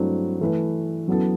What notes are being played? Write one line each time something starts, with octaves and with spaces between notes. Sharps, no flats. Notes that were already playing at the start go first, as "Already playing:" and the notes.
Already playing: G2 F#3 A3 C4 E4
E3 A3 E4 B4
F#2 F#3 B3 E4 A4